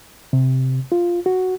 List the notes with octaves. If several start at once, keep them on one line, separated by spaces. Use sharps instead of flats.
C3
F4
F#4